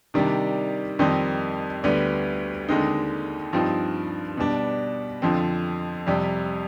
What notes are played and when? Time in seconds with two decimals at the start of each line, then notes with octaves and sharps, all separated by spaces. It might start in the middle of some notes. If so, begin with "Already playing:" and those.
0.14 C3 D#3 G3 D4
0.99 F2 D#3 G3 C4 D#4
1.83 D2 D3 G3 B3
2.68 D#2 D3 G#3 C4 D#4
3.53 G2 F3 C4 D#4
4.37 B2 G3 D4
5.22 F2 D3 F3 C4
6.07 F2 C3 G3